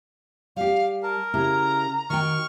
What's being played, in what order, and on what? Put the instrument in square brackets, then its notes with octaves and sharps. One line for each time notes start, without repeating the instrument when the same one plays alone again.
[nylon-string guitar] G3 G4 [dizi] F5
[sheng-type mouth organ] A#4 [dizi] A5
[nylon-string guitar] C#3 E4 G4 [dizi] A#5
[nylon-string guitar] D#3 F#4 G5 [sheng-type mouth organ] C#6 F6